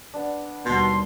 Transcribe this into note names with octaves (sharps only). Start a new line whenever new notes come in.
B3 D4
D#2 B2 G3 A5 A#5 C6